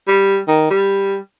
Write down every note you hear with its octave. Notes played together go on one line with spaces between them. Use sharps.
G3
D#3
G3